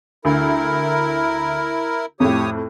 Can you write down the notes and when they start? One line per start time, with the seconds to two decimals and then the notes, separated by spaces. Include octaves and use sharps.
0.25 D2 E4 A#4
2.20 F2 A2 G4 C#5 D#6